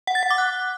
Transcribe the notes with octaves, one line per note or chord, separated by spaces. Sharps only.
F#5
A6
F#5
D6
F#6